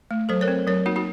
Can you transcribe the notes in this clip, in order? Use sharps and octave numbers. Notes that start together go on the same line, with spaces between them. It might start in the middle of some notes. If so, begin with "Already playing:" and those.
A3
F#3 A4 C5
A#4 C#5
C4
F#3 A#4 C#5
A#3 D#4 F#4
D#4 F#4